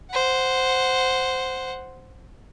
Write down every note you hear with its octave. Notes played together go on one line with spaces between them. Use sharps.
C5 F#5